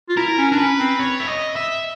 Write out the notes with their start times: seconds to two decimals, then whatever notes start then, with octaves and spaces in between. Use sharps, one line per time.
0.09 F4
0.17 E4 A#4
0.38 C#4
0.52 D4 A#4
0.58 C#4 B4
0.79 C4
0.99 C#5
1.20 E5
1.28 D#5
1.56 E5